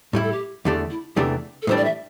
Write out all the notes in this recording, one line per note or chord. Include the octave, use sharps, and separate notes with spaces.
A2 G3 E4 G4
A4
G4
E2 D3 A3 D4 G4
E4
E2 C3 E3 A3 D4 G4
A4
A2 E3 G3 D4 C5
D5
E5